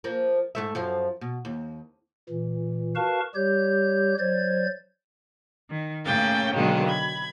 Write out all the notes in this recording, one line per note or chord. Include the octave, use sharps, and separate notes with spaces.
F3 A#3
G#2 A3 E5
F#2 F3 F5
B2
D#2
A#2 E3
F#4 A#4 B4 F5 A5 C#6
G3 G4 C#5 G6
F#3 C5 D5 G#6
D#3
A2 C#3 A#3 C#4 G5 A6
B2 D3 D#3 F#3 G#3 A#3
B5 G#6